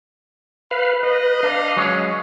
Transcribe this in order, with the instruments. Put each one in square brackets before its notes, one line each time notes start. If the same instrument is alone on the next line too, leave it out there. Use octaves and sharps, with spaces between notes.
[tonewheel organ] B4 F5 [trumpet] B5
[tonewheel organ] B4 [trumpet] D#5
[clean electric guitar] D4 [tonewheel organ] F5
[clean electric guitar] F#3 G#3 C#4